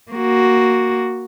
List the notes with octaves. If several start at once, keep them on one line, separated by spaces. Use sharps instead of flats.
A#3 F#4